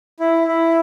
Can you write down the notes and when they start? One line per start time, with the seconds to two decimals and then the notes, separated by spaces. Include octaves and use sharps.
0.20 E4
0.47 E4